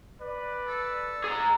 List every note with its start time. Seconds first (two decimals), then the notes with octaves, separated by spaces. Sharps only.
0.20 B4 D5
0.68 A4
1.24 G#4 A#5